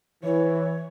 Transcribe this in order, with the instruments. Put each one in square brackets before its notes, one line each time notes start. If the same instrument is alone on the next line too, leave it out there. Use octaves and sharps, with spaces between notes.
[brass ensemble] E3 [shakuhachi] C#5